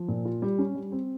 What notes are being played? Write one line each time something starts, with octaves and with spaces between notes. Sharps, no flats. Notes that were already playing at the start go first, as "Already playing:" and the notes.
Already playing: F3
A#2
F4
G3
C#4
G3
C4